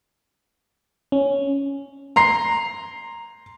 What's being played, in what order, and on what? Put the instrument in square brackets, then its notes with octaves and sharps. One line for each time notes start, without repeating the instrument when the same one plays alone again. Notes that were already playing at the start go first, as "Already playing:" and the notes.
[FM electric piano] C#4
[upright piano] A#5 C6 C7